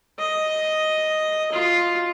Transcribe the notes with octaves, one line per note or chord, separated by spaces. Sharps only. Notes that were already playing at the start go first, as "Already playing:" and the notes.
D#5
F4